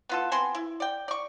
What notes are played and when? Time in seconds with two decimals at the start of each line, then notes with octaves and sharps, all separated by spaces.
0.09 B3 F4 A4
0.31 B3 C4 G#5 C6
0.55 E4
0.80 D5 G5
1.08 D5 C#6